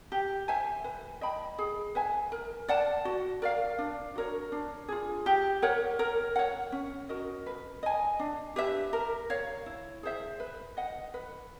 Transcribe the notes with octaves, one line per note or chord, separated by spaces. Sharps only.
G4
C5 E5 G#5
B4
D#5 G5 B5
G#4
B4 E5 G#5
A#4
D5 F#5 A5
F#4
A#4 D5 F5
D4
F#4 A#4 C#5
D4
F4 G#4
G4
A#4 C#5 F#5
A#4
C#5 F#5
C#4
F#4 A#4 D#5
B4
D#5 G#5
D4
G4 B4 E5
A#4
C#5 F5
E4
G#4 C5 E5
B4
D#5 F#5
B4